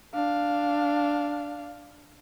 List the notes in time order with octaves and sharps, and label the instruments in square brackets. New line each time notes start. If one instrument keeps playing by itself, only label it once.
[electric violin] D4 F5